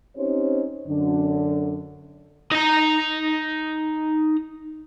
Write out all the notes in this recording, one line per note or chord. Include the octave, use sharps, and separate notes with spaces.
C4 C#4 D#4 G4 C5 C#5
F#2 D3 D4
D#4 A#5